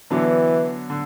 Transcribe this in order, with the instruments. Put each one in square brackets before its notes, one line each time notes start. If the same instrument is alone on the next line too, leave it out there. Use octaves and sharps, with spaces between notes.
[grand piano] D3 F#3 B3 D4 [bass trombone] E3
[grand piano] D3